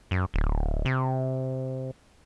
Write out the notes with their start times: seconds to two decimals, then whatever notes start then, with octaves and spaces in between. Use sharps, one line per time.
0.11 F#2
0.34 D1
0.85 C3